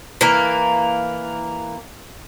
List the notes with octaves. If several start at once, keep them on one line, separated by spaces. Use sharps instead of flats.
E3 A#3